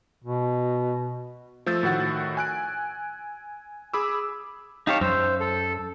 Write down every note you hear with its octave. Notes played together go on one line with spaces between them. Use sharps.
B2
F3 A3 E6 G6 A6
A2 D#3 F#4 F#5 A6
G#5 F#6 D7
G#4 B5 D6 E6
D#4 G4 C#5 F5 A5
F#2 C5 E6
A4